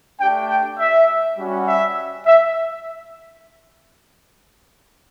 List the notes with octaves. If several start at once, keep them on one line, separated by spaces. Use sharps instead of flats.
A3 D4 G4 G5
G5
E5
G3 C#4 F#4
E5
E5